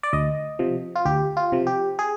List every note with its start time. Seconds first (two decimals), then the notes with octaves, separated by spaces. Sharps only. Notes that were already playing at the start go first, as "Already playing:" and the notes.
0.03 D5
0.13 D2 D#5
0.59 C3 F3
0.96 F4
1.05 D2 G4
1.37 F4
1.52 C3 F3
1.67 G4
1.99 G#4